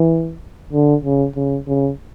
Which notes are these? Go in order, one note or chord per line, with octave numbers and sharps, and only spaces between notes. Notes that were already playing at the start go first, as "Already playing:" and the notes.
Already playing: E3
D3
C#3
C#3
C#3